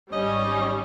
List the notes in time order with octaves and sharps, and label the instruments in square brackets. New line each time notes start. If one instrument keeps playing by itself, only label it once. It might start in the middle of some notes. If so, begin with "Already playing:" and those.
[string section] G#1 G3 C#4 [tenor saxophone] D#5